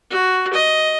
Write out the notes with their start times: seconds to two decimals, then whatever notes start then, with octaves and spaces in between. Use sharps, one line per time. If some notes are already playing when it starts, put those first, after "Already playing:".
0.11 F#4
0.53 D#5